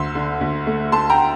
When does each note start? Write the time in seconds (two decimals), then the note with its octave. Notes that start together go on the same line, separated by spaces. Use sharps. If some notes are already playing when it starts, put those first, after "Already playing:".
Already playing: D2 C6 E6
0.15 D3
0.41 D2
0.67 A3
0.92 A3 A5 C6
1.10 G5 A#5